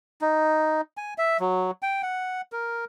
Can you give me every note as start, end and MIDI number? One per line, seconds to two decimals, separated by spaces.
0.22 0.81 63
0.97 1.14 80
1.18 1.37 76
1.40 1.71 54
1.82 2.02 79
2.03 2.41 78
2.52 2.85 70